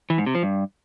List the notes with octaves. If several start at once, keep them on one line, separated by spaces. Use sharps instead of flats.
E3
G#2
C3
F3
G2